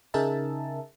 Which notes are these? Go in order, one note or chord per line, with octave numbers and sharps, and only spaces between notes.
C#3 D#4 G#4 A#4 E5 A5